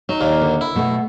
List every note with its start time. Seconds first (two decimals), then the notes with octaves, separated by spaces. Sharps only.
0.09 F#3 D#4
0.21 D#2 A#2 A#3
0.42 D3
0.61 E4
0.75 B2 A3 B3